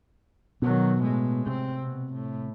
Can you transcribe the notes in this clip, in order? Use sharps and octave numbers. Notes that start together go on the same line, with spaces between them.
B2 D#3 F#3
A2 G#3
C3 C4
B2
A2